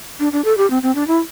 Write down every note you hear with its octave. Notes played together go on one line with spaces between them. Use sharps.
D4
D4
A4
G4
C4
C4
D4
E4